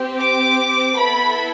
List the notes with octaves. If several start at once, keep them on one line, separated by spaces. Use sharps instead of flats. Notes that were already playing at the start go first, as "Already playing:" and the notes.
Already playing: C4 G4
D6
B3 E4 A4 B5